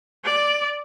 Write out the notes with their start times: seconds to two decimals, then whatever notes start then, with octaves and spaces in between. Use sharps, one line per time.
0.25 D5